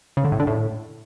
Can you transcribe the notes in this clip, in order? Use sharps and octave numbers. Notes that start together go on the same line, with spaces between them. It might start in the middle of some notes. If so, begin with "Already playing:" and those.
C#3
D3
A2
D3
A2